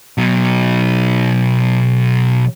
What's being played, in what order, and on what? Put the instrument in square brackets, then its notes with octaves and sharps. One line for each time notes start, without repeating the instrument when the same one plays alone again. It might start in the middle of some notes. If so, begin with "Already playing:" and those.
[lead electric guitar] B2 F#3